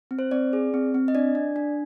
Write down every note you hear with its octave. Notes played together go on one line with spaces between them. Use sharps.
C4
C5
C4 D5
G#4
C4
C4
D#5
D4 D5
D4
D4